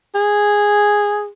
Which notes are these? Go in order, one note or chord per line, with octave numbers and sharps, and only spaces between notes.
G#4